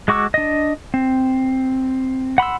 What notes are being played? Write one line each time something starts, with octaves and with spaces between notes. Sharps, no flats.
G#3 F#4 C#6 D6 E6
D4 D#5
C4
F#5 B5 C6 E6